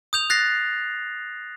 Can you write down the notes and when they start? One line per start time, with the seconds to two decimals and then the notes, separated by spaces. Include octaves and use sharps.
0.13 D#6 G6 F7
0.30 F#6 A6 A#6 C7